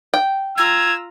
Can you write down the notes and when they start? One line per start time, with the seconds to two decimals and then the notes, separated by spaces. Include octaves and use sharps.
0.14 G5
0.58 F4 A#5 E6 G#6